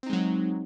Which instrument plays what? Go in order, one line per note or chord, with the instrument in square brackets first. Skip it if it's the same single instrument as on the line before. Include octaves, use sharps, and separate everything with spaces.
[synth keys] C4
D#4
G#3
F#3